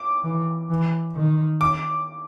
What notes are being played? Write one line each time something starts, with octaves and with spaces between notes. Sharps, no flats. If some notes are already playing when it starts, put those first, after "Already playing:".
Already playing: D6
E3
E3
D#3
D6